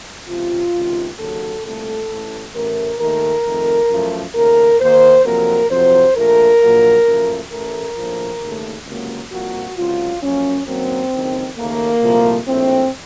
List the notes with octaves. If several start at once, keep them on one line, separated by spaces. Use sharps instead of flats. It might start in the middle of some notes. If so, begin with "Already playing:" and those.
C#2 C3 F3 F4
C#2 C3 D#3
D#2 C#3 F#3 A4
C2 A#2 A3 A4
A1 A2 A3
A1 A2 A3 A#4
D#2 D#3 A3 A#4
F2 D#3 A3
F#2 F3 A3
D#2 C#3 A3 A#4
D#2 D#3 A#3 C5
F2 C3 F#3 A#3 A#4
F2 C3 F#3 C5
A#1 A#2 A3 A#4
A#1 A#2 F#3 A#3
F#1 F#2 F3 A3
A1 A2 A3 A#4
A#1 A2 F3
D#2 C#3 A3
C#2 C3 F#3 A#3
C2 A#2 F3 A#3 F#4
C#2 C3 F#3 F4
F#2 F3 A#3 C#4
F#2 D#3 F#3 A#3 C4
F#1 F2 D#3
D#2 C#3 A3 A#3
C2 A#2 F3 A3
A#1 A2 A3 C4